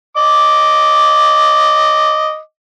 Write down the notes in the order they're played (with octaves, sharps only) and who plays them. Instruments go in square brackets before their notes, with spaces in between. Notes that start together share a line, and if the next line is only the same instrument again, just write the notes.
[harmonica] D#5 D6